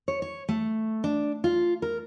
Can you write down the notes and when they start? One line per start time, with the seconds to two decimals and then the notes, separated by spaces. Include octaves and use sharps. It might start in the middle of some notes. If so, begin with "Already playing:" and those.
0.08 C#5
0.22 C#5
0.49 A3
1.04 D4
1.44 F4
1.82 A#4